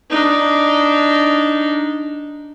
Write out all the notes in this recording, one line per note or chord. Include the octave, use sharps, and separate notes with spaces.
D4 D#4